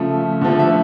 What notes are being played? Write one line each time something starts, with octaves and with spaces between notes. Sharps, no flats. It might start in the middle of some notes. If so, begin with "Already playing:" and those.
Already playing: C#3 F3 A3 E5
D3 F3 A3
E5